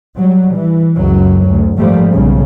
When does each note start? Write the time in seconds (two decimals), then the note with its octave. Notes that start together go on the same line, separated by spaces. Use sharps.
0.17 F#3 G3
0.54 E3
0.96 C#2 F#2 F#3
1.48 D2
1.77 G#1 F3 G3 A3 A#3
2.11 B1 A2 C#3